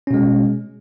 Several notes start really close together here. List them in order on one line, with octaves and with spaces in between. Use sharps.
C#4 B2 G#3